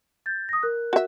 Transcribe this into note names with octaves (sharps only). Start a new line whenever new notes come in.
G6 A6
D#6 A#6
A#4 F#6
F#4 E5